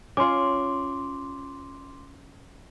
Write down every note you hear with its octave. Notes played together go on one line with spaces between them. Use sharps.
C#4 F4 C6 D6